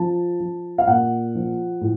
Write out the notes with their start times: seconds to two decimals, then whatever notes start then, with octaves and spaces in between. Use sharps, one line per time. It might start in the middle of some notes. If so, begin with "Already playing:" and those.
Already playing: F3 A5
0.40 F3
0.78 F5
0.87 A#2 F#5
1.35 F3
1.81 A2